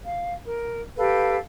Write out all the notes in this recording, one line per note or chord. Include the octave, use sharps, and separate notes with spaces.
F5
A#4
G4 A4 B4 F5